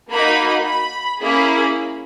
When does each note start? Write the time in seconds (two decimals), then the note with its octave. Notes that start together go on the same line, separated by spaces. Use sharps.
0.10 A#3 D#4 F#4 B5
0.66 B5
1.21 A#3 C#4 E4 G#4 B5